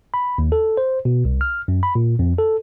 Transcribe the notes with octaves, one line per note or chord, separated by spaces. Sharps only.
B5
D#2
A4
C5
B2
C2
F6
F#2
B5
A#2
F2
A4